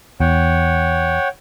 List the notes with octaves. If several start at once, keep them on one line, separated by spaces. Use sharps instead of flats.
E2 C#5 F#5 G5